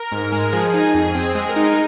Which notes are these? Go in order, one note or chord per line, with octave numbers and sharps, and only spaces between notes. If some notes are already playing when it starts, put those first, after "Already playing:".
Already playing: A#4
G#2
G#3
F3 G#4
D#4
F2
C4
G#3 G#4
A#4
D#4
A#4